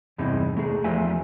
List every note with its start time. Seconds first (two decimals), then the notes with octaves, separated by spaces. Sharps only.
0.18 E2 G2 C3 D#4 E4
0.57 A3 D#4 G#4
0.84 E2 F3 A3 G4 E5 G#5